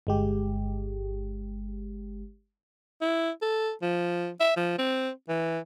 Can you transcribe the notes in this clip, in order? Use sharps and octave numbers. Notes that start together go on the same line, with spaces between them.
G1 G#3 G4
E4
A4
F3
E5
F3
C4
E3